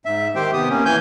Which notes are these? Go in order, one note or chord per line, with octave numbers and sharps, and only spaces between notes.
G#2 E5
D#3 G4 C5 G5
C3 B3 G4 D#6
A#3 C#4
E3 G#5 G6